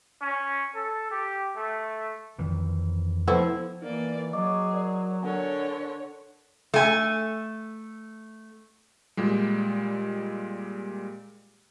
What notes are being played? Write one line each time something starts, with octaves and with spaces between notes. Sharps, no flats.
C#4
A4
G4
A3
F2 D#3 E3
F3 A3 B3 E4 C5
E3 A#3 D#4 D5
F#3 G#4 D#5 C#6 D6
A#4 D5
D3 A#4 C#5 F#5 G#5
A3 G#5
A#2 G3 G#3